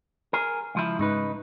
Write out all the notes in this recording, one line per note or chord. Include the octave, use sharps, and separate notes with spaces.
G#4 A#4
C#2 F3 E4
G#2 C#3 D#4 B4